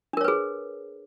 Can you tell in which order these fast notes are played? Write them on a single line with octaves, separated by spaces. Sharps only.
D4 A#4 C#5 B4 G#4